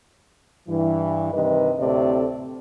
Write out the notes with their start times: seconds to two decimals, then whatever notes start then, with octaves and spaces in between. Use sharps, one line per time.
0.68 G2 E3
1.33 G2 C3 D#3 B4 D#5
1.79 D2 A2 C3 A3 A4 D5